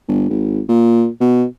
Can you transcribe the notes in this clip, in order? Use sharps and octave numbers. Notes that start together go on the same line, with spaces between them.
G1
G#1
A#2
B2